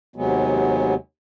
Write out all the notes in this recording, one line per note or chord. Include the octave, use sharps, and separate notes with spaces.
D#2 C3 F#3 G#3 B3